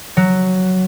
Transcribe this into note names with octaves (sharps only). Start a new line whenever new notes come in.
F#3